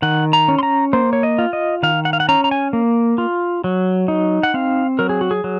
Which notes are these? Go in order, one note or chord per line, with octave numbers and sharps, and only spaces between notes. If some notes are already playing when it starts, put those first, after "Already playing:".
D#3 F#5
A#5
C#4
C6
A#5
A#3 C5
C#5
D#5
F4
D#5
D#3 F5
F#5
F5
F#5
C#4 A#5
A#5
G#5
A#3
F4
F#3
D#4
F#5
C4 F5
F#3 A#4
G#4
F#4
G#4
F#3